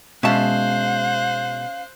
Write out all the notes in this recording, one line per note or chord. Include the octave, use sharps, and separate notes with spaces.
B2 G#3 C#4 C5 E5 F5 A5 F#6